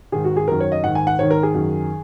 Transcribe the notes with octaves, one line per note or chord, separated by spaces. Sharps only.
G#2 D#3 G#4
F#4
G#4
F#2 D#3 A#4
C#5
D#5
G#2 D#3 F#5
G#5
F#5
G#2 D#3 C#5
A#4
G#4
F#2 D#3